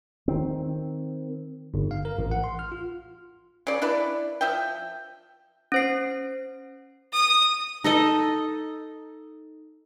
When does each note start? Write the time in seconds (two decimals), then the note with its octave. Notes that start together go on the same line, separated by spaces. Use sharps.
0.28 D#3 C4
1.74 G1
1.91 F5
2.05 A#4
2.19 A1
2.31 F#5
2.44 C6
2.59 F6
2.72 F4
3.67 C#3 D5
3.82 D4 E4 B4 D5
4.41 F3 E5 G5
5.72 C#4 C5 C7
7.13 D#6
7.84 D#4 A4 D#5